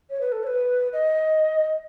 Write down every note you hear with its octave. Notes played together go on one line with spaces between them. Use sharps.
C#5
B4
A4
C#5
B4
D#5